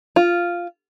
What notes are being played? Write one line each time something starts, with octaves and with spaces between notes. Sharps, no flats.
F4